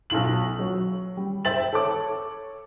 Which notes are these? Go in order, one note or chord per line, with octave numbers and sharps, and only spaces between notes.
B1 F4 F#7
F#3
G3
C5 E5 G5 A6 F#7
A4 C#5 D6